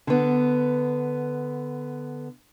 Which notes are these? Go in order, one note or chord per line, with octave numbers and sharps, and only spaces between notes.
D3 B3